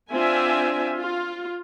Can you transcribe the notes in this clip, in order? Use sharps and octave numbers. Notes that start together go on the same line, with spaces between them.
C4 D4 F4 E5 G#5
F4